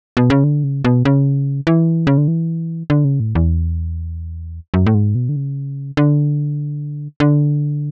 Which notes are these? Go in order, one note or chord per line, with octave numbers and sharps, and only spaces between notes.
B2
C#3
D3
C#3
B2
C#3
E3
C#3
D3
E3
D3
C#3
A2
E2
F#2
A2
G#2
B2
D3
C#3
D3
D3